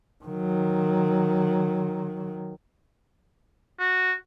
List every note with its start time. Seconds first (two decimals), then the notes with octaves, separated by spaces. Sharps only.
0.25 D#3 F#3
3.79 F#4